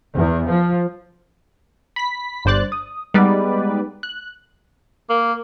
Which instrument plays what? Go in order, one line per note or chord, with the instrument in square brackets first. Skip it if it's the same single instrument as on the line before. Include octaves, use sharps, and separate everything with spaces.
[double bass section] E2
F3
[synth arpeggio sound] B5 B6
G1 G2 C5 D5 F#6 A6
D#6
G3 G#3 B3 D#4 B4 D5
F#6
[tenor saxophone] A#3